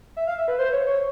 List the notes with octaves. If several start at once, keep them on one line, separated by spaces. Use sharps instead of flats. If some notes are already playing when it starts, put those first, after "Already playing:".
E5
F5
E5
B4
C5
C#5
C#5